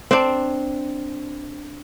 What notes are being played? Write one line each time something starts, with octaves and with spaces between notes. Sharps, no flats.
C4 D4